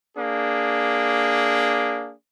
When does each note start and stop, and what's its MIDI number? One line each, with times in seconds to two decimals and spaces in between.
0.17 2.13 58
0.17 2.13 62
0.17 2.13 68